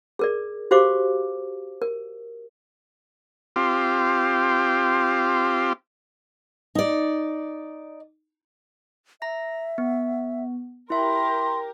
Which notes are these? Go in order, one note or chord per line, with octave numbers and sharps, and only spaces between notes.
G#4 A#4 D5
F#4 G4 C5 F5 C#6 D6
A#4
C4 F4 G4
D#4 D5
E5 A#5 A#6
B3
E4 G4 A#4 E5 C6